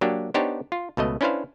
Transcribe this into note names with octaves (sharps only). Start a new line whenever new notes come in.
F#3 A#3 D4 G4
B3 D4 D#4 G4 C5 C#5
F4
C#2 B2 A3 D#5
C#4 D4 E4 B4 C5 F5